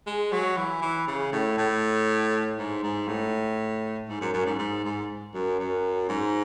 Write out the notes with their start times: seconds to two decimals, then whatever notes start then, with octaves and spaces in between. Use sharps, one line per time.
0.07 G#3
0.32 F#3
0.57 E3
0.82 E3
1.07 C#3
1.32 A2
1.58 A2
2.58 G#2
2.83 G#2
3.08 A2
4.09 G#2
4.21 F#2
4.33 F#2
4.46 G#2
4.59 G#2
4.84 G#2
5.34 F#2
5.59 F#2
6.09 G#2